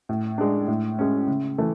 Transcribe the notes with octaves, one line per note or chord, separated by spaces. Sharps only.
A2
G#3 D4
A2
G#3 C#4
C#3
E3 A3